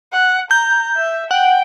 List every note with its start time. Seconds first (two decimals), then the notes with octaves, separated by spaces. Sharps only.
0.12 F#5
0.51 A#5 G6
0.96 E5
1.31 F#5 G5